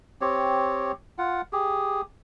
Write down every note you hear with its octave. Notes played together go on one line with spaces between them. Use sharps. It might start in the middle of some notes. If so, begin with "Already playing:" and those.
C4 G4 C#5
F4 F#5
G4 G#4